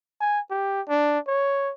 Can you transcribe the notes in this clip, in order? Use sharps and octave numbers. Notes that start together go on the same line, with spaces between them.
G#5
G4
D4
C#5